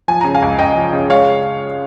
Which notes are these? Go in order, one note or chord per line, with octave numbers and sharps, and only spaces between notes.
F3 G#5
C#3 A#5
F5 G#5
C#2
C#2 D#5 G5
F3
C#3
G#3 C#5 F5